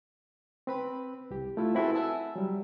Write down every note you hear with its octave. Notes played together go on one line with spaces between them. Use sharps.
C4 B4 B5
C2 G4
A3 E4 F4
C4 E4 F#4 G#4 A4 B4
E5 F#5 G#5 A5 E6
F#3 G3